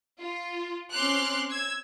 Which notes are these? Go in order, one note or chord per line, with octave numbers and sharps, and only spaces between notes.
F4
C4 C#4 C6 D6 F6 F#6
E6 G#6